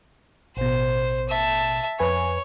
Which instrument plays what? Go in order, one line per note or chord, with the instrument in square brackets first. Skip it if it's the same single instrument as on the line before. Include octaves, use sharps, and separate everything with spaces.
[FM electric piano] A1 B2 [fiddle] C5
[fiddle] E5 A5
[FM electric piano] F2 B4 G#5 [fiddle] C#5